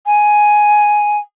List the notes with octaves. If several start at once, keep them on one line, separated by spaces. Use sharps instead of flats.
G#5